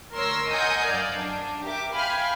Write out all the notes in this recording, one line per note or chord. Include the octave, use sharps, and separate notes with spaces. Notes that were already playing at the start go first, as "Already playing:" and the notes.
D2 A#4 C#5 C6 E6 A#6
A#4 D#5 F#5 G#5 D#6 G6
F#2 D5 F5
D4
G4 A#4 E5 D6
F5 G5 G#5 B5 C6 F6